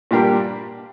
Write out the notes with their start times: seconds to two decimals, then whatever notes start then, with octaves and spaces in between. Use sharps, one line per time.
0.11 A#2 G3 D4 G4 A#4